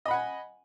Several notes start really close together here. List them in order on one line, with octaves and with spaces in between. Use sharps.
D#5 B5 F#5 G#5